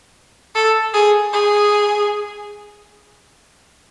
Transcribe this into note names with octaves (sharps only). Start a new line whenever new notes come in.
A4
G#4
G#4